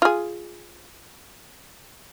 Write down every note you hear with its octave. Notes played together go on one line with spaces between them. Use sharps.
F4 G#4